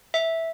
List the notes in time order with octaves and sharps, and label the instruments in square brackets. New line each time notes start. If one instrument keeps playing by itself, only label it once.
[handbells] E5